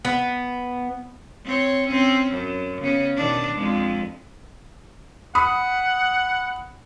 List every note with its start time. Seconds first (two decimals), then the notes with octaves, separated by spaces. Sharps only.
0.05 B3
1.45 C4 C#5
1.88 C4 C#4
2.31 F#2
2.82 C#3 B3 C#4
3.16 B2 D#3 D4
3.55 F2 G#3
5.35 F#5 B5 D#6